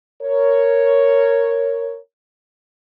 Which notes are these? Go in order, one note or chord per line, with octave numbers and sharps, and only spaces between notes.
A#4 C#5